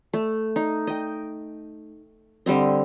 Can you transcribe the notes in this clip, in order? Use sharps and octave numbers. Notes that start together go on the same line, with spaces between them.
A3
D#4
D#5 G5
D3 G3 C4 D#5